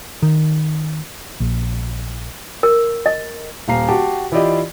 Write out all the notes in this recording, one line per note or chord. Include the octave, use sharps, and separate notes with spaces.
D#3
A#1
A#4
D#5
D#1 F5 A#5 C7
F#4 G4 G5 A5
E3 E4 F4 G4 D5 D#5